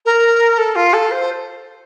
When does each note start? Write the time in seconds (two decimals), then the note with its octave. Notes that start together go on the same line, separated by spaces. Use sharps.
0.05 A#4
0.58 A4
0.75 F4
0.93 A4
1.11 C5